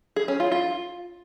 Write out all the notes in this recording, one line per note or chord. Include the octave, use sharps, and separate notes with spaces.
G#4
C#4
F4
F4